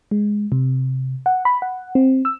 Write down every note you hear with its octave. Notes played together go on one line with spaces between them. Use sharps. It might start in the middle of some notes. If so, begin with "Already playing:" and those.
G#3
C3
F#5
B5
F#5
C4
E6